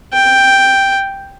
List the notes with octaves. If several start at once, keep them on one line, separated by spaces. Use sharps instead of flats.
G5